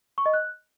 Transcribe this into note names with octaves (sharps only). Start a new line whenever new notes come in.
C#6
D#5
F#6